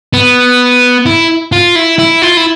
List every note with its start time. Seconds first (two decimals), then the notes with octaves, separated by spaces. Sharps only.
0.13 B3
1.06 E4
1.52 F4
1.75 E4
1.98 E4
2.22 F4
2.37 E4